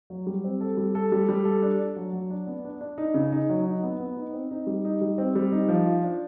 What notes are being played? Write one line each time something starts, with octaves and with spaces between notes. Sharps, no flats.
F#3
G3
C4
A4
G3
A4
G3
G3
A4
D4
D4
F#3
F#3
D4
B3
D4
D4
D#4
C#3
D#4
F#3
D#4
B3
B3
D#4
C4
D#4
G3
D#4
G3
C4
G3
D#4
F3
F4
D4